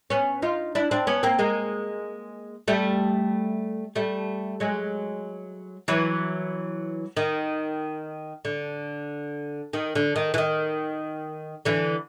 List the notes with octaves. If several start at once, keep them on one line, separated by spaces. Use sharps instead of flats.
B3 C#4
D#4 F4
D4 E4
C4 D4
B3 C#4
A#3 C4
G#3 A#3
G3 A3
G3 A3
F#3 G#3
E3 F#3
D#3
D3
D#3
D3
D#3
E3
D#3
D3 E3